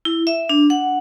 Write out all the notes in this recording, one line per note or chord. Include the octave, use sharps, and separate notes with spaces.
E4
E5
D4
F#5